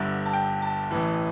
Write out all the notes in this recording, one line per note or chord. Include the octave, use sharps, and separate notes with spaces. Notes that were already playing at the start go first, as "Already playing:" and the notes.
Already playing: G1 G2 D3 E5
A5
G5
A5
A1 A2 E3